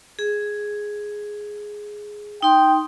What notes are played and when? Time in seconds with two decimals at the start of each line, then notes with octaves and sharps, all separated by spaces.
0.19 G#4
2.43 D#4 G5 C6